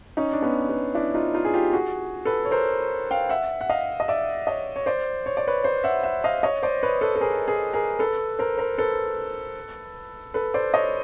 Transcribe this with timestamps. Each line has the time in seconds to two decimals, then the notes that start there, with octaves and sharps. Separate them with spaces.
0.17 C#4 D#4
0.33 D4
0.42 B3 C#4
0.69 B3
0.95 D4 E4
1.14 D#4 F4
1.34 D#4 F4
1.45 G#4
1.54 F4 G4
1.73 F#4 G#4
2.25 A4 B4
2.45 C#5
2.51 A#4 C5
3.11 F5 G5
3.29 E5 F#5
3.61 F#5
3.69 D#5 F5
4.00 D#5
4.08 D5 E5
4.47 C#5 D#5
4.76 C#5
4.86 C5 D5
5.26 C#5
5.37 D5
5.47 B4 C#5
5.64 C5 D5
5.84 E5 F#5
6.03 E5 F#5
6.24 D#5 F5
6.43 C#5 D#5
6.63 C5 D5
6.83 B4 C#5
7.01 A4 B4
7.16 A4
7.21 G#4 A#4
7.48 G#4 A#4
7.73 G#4 A#4
7.99 A4 B4
8.39 A#4 C5
8.58 A#4 C5
8.78 A4 B4
10.34 A4 B4
10.54 C5 D5
10.74 C#5 D#5